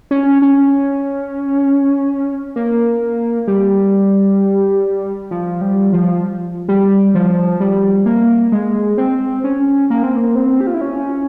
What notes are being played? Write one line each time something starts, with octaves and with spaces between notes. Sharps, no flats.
C#4
C#4
A#3
G3
F3
G3
F3
G3
F3
G3
A#3
G#3
C4
C#4
A#3
C4
A#3
C4
G4
F4
E4
C#4